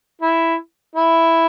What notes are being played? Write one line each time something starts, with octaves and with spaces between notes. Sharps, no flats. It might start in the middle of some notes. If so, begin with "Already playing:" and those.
E4
E4